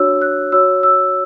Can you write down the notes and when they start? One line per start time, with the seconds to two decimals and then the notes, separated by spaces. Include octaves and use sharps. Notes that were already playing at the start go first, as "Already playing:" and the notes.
Already playing: D4 F#4 C#5 E6
0.22 F#6
0.52 F#4 C#5 E6
0.83 E6